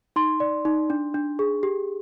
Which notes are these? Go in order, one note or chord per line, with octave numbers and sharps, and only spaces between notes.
D#4 C6
D5
D#4
D4
D4
G#4
G4